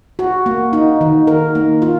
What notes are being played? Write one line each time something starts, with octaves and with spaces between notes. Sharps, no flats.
F#4
A#3
D#4
D#3
A#4
A#3
F4